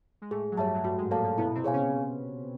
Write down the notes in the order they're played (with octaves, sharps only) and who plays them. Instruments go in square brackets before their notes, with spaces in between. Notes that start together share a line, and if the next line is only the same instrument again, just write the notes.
[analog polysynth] G#3
[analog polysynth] A2 A3 [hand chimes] G#4
[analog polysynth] F#3
[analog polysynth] G2 G3 [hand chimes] C#5 E5 A5
[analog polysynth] F#3
[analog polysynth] G2 G3 [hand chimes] F#4
[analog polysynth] G#2 G#3
[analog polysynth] A#2 A#3 [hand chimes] A4 C#5 F5 A5
[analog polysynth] A#2 A#3
[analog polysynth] B2 B3 [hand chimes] E4
[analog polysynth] C3 C4
[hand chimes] G#4 C#5 F5 G#5
[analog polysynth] C#3 C#4